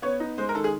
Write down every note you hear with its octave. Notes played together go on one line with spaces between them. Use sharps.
B3 C#5
D#4
G#3 C5
A#4
D#3 A4
G#4